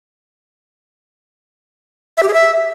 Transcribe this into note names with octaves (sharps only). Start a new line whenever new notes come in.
E5
G4
G#4
E5